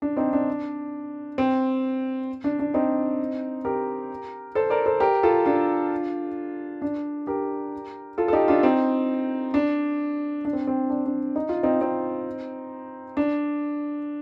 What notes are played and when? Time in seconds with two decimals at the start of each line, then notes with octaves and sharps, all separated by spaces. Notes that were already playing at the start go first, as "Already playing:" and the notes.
0.02 D4
0.17 C4 D#4
0.33 D4
1.38 C4
2.44 D4
2.59 D4
2.74 C4 D#4
3.65 G4 A#4
4.55 A4 C5
4.70 A#4 D5
4.86 A4 C5
5.00 G4 A#4
5.23 F4 A4
5.46 D4 F4
6.82 D4
7.27 G4 A#4
8.18 F4 A4
8.28 A4
8.33 D#4 G4
8.48 D4 F4
8.63 C4 D#4
9.54 D4
10.45 D4
10.53 C4
10.67 C4
10.90 D4
11.05 D4
11.36 D#4
11.49 F4
11.63 C4 D#4
11.81 C4 D#4
13.17 D4